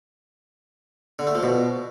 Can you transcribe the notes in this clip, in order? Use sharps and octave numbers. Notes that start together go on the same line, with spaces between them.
D3
A3
F3
B2